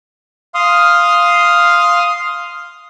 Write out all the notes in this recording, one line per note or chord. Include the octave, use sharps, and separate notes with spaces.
F5 C6 D#6 F6